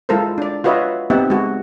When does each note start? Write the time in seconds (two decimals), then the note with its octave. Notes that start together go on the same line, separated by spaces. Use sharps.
0.09 G#3 E4 F4 A4 A#4 C5
0.38 D4 D5
0.64 F4 F#4 B4 C#5 D#5 E5
1.10 B3 C4 D#4 G4 E5 F#5
1.30 G#3 F#4